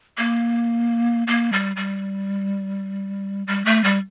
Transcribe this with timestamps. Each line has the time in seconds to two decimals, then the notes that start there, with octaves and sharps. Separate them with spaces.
0.18 A#3
1.27 A#3
1.52 G3
1.76 G3
3.47 G3
3.65 A3
3.84 G3